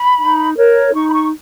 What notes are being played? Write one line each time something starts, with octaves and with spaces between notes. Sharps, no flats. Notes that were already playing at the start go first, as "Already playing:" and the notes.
Already playing: B5
D#4
A#4 C#5
D#4 C#6
B5
C#6